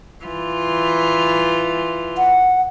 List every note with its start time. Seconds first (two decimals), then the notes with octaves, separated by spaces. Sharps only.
0.24 E3 F4
2.18 F#5